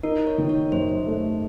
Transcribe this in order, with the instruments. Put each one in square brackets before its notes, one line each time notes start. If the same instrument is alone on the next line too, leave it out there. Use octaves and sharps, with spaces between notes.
[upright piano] D#4 [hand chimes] A#4
[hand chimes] C#5
[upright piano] D#3
[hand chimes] C#5
[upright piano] F#2 [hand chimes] C5
[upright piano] A3